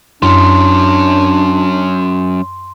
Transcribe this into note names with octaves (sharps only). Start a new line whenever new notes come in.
F#2 F#3 C#4 D4 C6